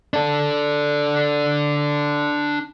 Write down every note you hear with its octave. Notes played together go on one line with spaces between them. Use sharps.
D4 A4